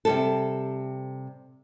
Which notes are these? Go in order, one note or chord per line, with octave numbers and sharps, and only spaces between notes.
C3 G3 A4